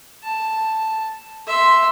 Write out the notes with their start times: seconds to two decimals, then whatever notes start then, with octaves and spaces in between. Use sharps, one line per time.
0.24 A5
1.47 E5 C6